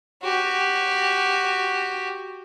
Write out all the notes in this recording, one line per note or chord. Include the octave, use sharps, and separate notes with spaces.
F#4 G4